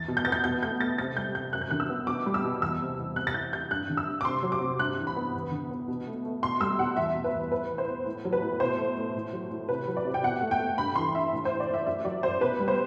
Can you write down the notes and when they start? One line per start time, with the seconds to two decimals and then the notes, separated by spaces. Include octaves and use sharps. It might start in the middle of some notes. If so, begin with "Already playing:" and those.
Already playing: E2 A6
0.08 B2
0.17 G6
0.25 B3 A6
0.32 G6
0.44 B2 G6
0.63 A3 G6
0.80 A3 A6
0.98 C3 A6
1.17 G3 G6
1.35 C3 G6
1.53 F#2 F#6
1.61 G6
1.71 D3 F#6
1.80 E6
1.90 B3
2.07 B2 D6
2.26 G3
2.34 E6
2.44 B2
2.62 E2 E6
2.80 C3
2.98 E2
3.16 C3 F#6
3.27 A6
3.34 E3 G6
3.52 C3 G6
3.71 G2 F#6
3.90 D3
3.97 E6
4.07 G2
4.21 D6
4.25 C3 C6
4.43 F#3
4.52 D6
4.61 C3
4.79 G2 F#6
4.98 E3
5.07 B5
5.16 B3
5.33 E2
5.52 D3
5.71 B3
5.88 B2
6.07 A3
6.25 A3
6.43 B2 C6
6.61 G3 E6
6.79 B2 F#5
6.97 E2 E5
7.15 B2
7.24 B4
7.34 E2
7.52 A2 B4
7.70 E3
7.78 C5
7.88 B3
8.06 A2
8.25 F#3
8.33 B4
8.42 A2
8.60 B2 C5
8.78 A3
8.97 A3
9.15 A2
9.33 F#3
9.51 A2
9.69 C3 B4
9.87 F#3
9.97 D5
10.05 C3
10.14 G5
10.23 B2 F#5
10.41 A3
10.51 G5
10.59 A3
10.78 G2 B5
10.96 E3 C6
11.14 G2 E5
11.33 A2
11.45 E3 C5
11.60 D5
11.69 A2 E5
11.86 F#2 E5
12.05 F#3 D5
12.23 F#2 C5
12.41 B2 B4
12.60 G3
12.68 C5